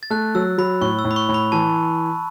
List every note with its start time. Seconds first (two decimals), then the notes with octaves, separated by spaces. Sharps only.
0.03 A6
0.10 A3 F#6
0.35 F#3 E6
0.58 F#3 B5
0.81 A2 C#6
0.99 E6
1.05 A2
1.11 B5
1.16 C#6
1.29 A2
1.34 B5
1.52 E3 A5